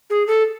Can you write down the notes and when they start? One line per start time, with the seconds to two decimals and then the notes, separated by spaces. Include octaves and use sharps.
0.10 G#4
0.27 A4